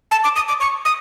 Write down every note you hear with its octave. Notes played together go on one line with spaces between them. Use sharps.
A5
D6
D#6
D6
C#6
D#6